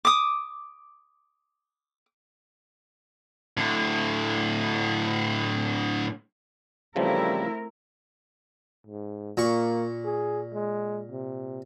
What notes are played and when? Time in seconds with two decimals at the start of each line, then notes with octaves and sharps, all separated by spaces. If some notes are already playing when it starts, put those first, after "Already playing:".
0.05 D6 D#6
3.57 A2 D3
6.96 C#3 E3 F3 G3 A3 C4 E4 A#4
8.87 G#2
9.37 A#2 A#3 C#6
10.05 G#4
10.54 G#3
11.11 C3